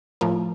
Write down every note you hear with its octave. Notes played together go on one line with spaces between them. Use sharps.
A2 F3 A#4